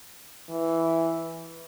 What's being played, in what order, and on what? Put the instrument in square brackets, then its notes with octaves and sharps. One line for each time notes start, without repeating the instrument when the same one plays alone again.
[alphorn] E3